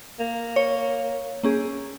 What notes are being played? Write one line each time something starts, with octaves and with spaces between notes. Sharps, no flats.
A#3
C#5
A#3 C#4 G#4